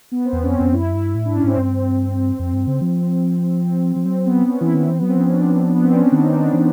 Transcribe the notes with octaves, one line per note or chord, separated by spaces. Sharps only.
B3
C4
E2 B3
F2 C#4
C4
F2
F#2 E4
G2 E4
A2
G#2 D4
C#4
G#2 C4
G2
F2 C4
G2
C#3
F3
C4
F3
F#3 C4
B3
C#4
E3 E4
D#3 E4
E3 C4
F#3 B3
C4
F3 C#4
D4
B3
C4
C#4
D4
D#3 D#4
D#4
D4
E3